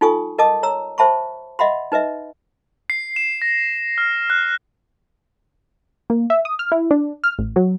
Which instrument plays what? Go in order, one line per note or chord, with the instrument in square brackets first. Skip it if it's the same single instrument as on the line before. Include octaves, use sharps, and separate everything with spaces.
[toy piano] D#4 F4 A4 G#5 C#6 D#6
A#4 D#5 A5 D6 D#6
C#5 A#5 E6
C5 E5 A5 B5 C#6
D#5 E5 F#5 B5 C6
D#4 B4 D#5 E5
[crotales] C7
E7
A#6
F6
F#6
[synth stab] A#3
E5
D#6
F6
E4
D4
F6
A1
F#3